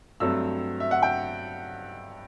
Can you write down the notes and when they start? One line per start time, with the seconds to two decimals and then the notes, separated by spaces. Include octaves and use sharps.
0.20 G2 F#3 A3 C4 E6
0.80 E5
0.91 F#5
1.03 G5